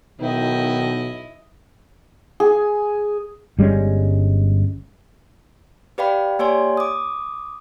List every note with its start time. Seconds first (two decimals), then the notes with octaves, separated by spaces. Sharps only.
0.20 B1 B2 D#3 E4 D#5
2.40 G#4
3.59 G1 G3 G#3 C#4
5.98 G4 B4 D5 F5 G5 B5
6.39 A#3 G4 C#5 D5 G#5 C6
6.77 D6 D#6